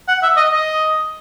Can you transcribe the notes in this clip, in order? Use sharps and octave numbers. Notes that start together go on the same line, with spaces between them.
F#5
E5
D#5
D#5